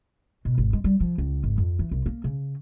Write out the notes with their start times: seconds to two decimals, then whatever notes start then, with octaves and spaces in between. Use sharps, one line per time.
0.45 B2
0.58 G#1
0.73 G#3
0.84 G3
1.00 F3
1.18 C#2
1.44 G#1
1.58 F2
1.79 E3
1.91 C2
2.06 A#3
2.24 C#3